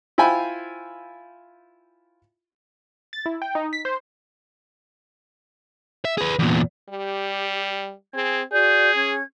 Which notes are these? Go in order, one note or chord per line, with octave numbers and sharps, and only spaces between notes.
E4 F4 C5 G5 G#5 B5
A6
E4
G5
D#4
B6
C5
E5
G#4 B4
E2 A#2
G3 G4
C4 G#4 G#5 G#6
F#4 G#4 D5 G6
C#4 G#6